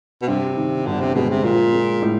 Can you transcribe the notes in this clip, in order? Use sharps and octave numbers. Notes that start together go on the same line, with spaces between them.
B2
G2 C3
D#3
G1 D3
C3
B2 G#3
C3
A#2 F3
G#3
A2